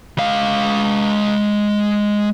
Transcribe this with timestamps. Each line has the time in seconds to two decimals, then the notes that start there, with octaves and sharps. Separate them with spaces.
0.18 G#3 F5